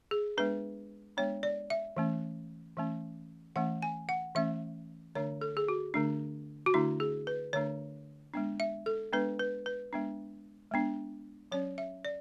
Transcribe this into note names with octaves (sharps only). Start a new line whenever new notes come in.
G#4
G#3 B3 D4 B4
G#3 B3 D4 C#5
D5
E5
E3 A3 C#4
E3 A3 C#4
E3 A3 C#4 F#5
G#5
F#5
E3 A3 C#4 E5
D3 A3 D4 C#5
A4
G#4
F#4
D3 A3 D4
F#4
D3 A3 D4 E4
G#4
B4
D3 A3 D4 C#5
G#3 B3 D4
E5
A4
G#3 B3 D4 B4
B4
B4
G#3 B3 D4
G#3 B3 D4
F#3 C#4 C#5
E5
D5